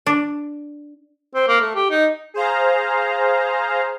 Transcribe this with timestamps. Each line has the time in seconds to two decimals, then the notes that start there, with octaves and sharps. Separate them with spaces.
0.07 D4
1.35 C4
1.48 A#3
1.61 A3
1.75 G4
1.91 D#4
2.34 G#4 C5 F5 A#5